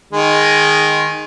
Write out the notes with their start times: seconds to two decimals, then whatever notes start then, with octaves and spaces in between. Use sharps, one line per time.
0.13 D#3 G#3